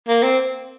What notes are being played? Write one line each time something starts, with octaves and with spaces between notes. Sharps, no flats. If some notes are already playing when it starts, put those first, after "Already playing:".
A#3
C4